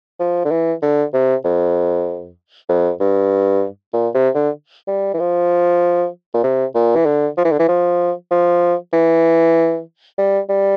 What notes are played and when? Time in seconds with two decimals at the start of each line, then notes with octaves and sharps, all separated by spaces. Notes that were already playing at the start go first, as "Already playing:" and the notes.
0.20 F3
0.45 D3
0.51 E3
0.82 D3
1.14 C3
1.44 F2
2.69 F2
3.00 G2
3.93 A#2
4.14 C3
4.35 D3
4.88 G3
5.14 E3
5.19 F3
6.34 A#2
6.43 C3
6.75 A#2
6.96 E3
7.05 D3
7.37 F3
7.45 E3
7.52 D3
7.59 E3
7.68 F3
8.31 F3
8.93 E3
10.18 G3
10.49 G3